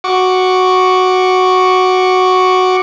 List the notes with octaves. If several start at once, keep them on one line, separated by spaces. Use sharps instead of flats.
F#4 C#6 D6